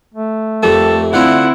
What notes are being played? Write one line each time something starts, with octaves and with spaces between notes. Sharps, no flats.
A3
F2 G3 A#3 A4
D3 C4 D4 E4 F4 F#5